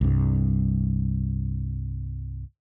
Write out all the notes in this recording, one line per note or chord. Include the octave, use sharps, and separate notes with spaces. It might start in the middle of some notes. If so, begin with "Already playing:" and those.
C2 G2